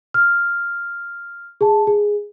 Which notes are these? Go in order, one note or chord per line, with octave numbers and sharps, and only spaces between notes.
F6
G#4 A5
G#4